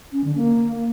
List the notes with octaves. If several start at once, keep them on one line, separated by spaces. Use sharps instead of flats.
C#4
D3
A#3